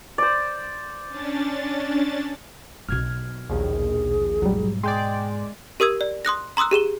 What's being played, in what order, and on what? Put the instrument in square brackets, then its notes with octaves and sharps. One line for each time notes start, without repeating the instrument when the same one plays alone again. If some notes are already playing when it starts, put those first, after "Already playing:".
[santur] C5 D5
[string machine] C#4 D4 A6
[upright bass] B1 B2 [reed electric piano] F6 G#6
[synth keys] A#1 D#2 [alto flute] G#4
[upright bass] G#2 B2 [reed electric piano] F#3 G3
[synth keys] G#3 D5 [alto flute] G5 [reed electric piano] C6 G6 A6
[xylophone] G4 A#4 D#6 E6 G#6
D5
C6 D#6 F#6 A#6
A#5 C6 D#6 E6 F#6
G4 G#4 E7 G7